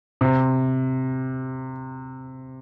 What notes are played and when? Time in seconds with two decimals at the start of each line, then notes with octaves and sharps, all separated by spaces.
0.21 C3